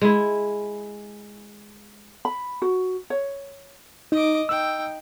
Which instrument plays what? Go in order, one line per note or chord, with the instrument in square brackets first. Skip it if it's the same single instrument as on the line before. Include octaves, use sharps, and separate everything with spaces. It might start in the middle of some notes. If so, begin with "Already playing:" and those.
[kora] G#3 E4
[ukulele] B5
F#4
C#5
[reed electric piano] D#4 [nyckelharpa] D#5 D6
[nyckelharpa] D#4 G5 [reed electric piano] E6